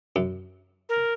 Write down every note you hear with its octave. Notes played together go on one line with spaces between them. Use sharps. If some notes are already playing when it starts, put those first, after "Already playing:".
F#2
A#4